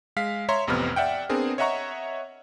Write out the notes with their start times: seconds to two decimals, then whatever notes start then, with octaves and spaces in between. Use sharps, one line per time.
0.16 G#3 F5 B6
0.49 C#5 E5 A#5 C6
0.67 A1 F2 C3 B3 F6
0.96 D5 E5 F#5 G5
1.29 B3 C4 D4 G#4 A#4
1.58 C#5 D#5 E5 F#5 A#5 C#6